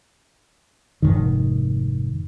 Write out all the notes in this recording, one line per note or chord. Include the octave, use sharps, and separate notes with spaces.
F1 C2 G#2 D#3